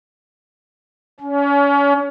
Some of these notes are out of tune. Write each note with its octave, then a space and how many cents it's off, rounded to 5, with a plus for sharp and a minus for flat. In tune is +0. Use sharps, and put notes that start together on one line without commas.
C#4 +30